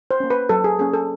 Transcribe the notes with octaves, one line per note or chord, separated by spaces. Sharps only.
C5
A#3 C#4
B4
F#3 A4
G#4
A#3 C#4 G#4
A4